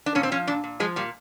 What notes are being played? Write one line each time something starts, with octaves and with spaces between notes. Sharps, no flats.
D4
A#2 C#4
C4
F3 C#4
A#2 D4
A#2
F3 G#3
A#2 G3